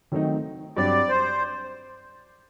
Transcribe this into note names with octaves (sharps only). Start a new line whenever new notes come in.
D#3 F#3 A3 C4 D#4
G2 F#3 C4 D5
C5